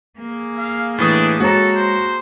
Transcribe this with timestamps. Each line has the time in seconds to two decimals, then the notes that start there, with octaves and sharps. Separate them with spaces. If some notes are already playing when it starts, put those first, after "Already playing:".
0.18 A#3 G#4
0.58 F5
0.98 A2 E3 D4 D#6
1.40 G#3 F#4 A4 C#5 A#5
1.75 C5